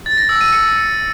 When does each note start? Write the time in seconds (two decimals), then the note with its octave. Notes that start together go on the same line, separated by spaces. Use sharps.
0.06 A6
0.18 A#6
0.29 E6
0.41 D#7
0.52 C#7